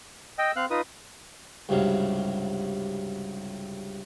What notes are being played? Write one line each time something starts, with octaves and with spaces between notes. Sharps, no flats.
D#5 G5 E6
C4 F5 F#6
D#4 F4 B4 D#6
C#2 G2 C3 F#3 F5